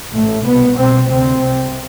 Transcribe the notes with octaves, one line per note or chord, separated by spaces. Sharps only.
A1 A2 A3
C2 B2 B3
C2 B2 C4
D2 C3 C4
C2 C3